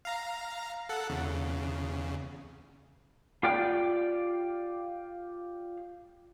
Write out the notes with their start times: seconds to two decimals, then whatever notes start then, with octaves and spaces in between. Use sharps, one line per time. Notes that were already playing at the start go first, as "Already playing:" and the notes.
0.05 F5 A#5
0.89 A4 F#5
1.10 E2 C#3
3.43 F4 G4 D5 G5 F6